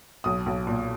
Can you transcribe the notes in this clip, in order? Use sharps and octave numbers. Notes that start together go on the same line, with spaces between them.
B1 D#6
B1
A#2